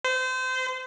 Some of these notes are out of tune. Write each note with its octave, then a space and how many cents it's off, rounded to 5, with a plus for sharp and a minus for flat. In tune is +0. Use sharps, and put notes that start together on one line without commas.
C5 -30